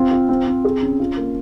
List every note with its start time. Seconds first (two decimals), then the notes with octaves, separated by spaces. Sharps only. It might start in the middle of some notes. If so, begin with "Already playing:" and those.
Already playing: C4 F4
0.11 F4
0.29 C4
0.47 C4
0.65 G#4
0.82 C#4
1.00 F4
1.17 A#3